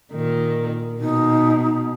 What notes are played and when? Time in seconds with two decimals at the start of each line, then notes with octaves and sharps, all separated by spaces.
0.12 A#2 D#3
1.01 B2 D#4